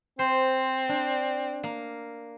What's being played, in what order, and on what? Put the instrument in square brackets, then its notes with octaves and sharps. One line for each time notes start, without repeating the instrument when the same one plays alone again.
[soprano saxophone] C4 [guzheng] C5
[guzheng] D4
A#3